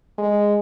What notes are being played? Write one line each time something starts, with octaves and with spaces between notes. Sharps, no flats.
G#3